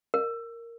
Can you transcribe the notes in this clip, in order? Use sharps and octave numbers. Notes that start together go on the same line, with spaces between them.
A#4